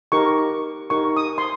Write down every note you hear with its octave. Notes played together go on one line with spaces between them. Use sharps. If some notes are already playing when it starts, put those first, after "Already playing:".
D#4 G4 A#4 C#6
D#4 G4 A#4 C#6
D#6
C6